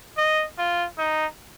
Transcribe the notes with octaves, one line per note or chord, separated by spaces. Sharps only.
D#5
F4
D#4